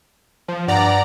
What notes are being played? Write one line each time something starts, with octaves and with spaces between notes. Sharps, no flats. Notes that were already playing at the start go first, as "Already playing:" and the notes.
F3
G2 D5 F#5 A#5